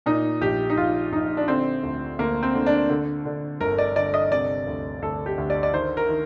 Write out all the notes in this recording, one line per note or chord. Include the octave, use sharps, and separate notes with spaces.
A#2 D#4
A#1 G4
D#4
A#1 F4
A#1 D#4
D4
D3 C4
D2
D2 A#3
C4
D3
D4
D3
D3
G1 A#4
D5
D3 D5
D#5
C3 D5
D2
D2 A4
G4
D2
D5
D5
D#3 C5
A#4
D#3